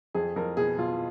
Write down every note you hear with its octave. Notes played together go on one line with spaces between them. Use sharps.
F2 G#4
F2 A#4
B2 G#4
B2 F4